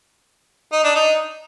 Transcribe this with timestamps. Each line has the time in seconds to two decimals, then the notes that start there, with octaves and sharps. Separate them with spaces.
0.72 D#4
0.84 D4
0.95 D#4